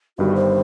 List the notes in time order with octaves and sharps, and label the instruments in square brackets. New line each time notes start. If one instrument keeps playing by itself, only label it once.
[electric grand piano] G1 G2 D#3 G3 [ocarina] F#4
[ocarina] C5